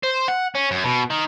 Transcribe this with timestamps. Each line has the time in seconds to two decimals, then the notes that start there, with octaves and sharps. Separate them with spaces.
0.03 C5
0.28 F#5
0.55 C#4
0.71 F#2
0.84 B2
1.10 D#3